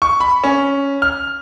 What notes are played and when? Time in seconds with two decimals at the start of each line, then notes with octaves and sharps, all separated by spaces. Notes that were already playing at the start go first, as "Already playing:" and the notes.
0.02 C#6
0.20 B5
0.44 C#4
1.02 F6